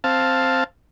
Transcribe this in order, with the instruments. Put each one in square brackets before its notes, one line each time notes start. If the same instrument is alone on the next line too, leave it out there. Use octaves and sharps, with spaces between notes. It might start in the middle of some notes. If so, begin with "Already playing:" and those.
[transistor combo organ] C4 F5 A5